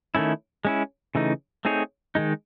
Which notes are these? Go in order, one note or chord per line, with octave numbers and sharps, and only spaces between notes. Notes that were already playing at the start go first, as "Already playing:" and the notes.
D#3 A3 C#4 E4
G#3 C#4 E4
C#3 E3 A3 D#4
A3 C4 D#4 G#4 C#5
D#3 G#3 D#4